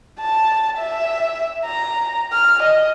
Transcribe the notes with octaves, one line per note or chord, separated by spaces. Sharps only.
A5
E5
A#5
F6
D#5